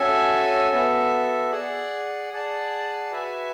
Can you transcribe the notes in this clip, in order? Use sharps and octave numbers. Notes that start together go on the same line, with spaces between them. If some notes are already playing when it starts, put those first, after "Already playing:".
Already playing: C#4 F#4 A4 E5 G#5
B3 F#4 A4 E5
G#4 D5 F#5
G#4 D5 F#5 A5
F#4 B4 E5 G#5